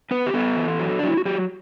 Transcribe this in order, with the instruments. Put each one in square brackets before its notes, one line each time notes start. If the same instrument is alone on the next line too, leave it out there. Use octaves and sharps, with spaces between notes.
[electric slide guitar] B3 B4
G4
B3 A4
E3
F#3
D4
F#3 E4
F#4
F#3 G4